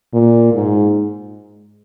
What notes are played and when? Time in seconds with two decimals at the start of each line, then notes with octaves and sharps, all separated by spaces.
0.13 A#2
0.53 G#2